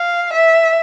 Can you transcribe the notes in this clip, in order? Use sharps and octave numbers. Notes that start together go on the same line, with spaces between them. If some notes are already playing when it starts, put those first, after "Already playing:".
Already playing: F5
E5